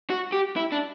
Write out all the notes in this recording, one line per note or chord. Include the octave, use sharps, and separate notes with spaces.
F#4
G4
E4
D4